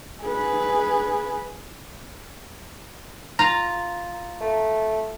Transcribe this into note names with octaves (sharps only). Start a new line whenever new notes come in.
G#4 B4
F4 A#5
A3